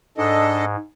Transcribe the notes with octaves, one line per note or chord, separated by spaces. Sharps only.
G#2 D4 A4 D#5